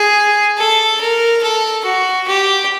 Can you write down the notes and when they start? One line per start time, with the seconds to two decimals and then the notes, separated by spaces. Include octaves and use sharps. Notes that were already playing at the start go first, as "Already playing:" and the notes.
Already playing: G#4
0.58 A4
1.01 A#4
1.43 A4
1.85 F#4
2.28 G4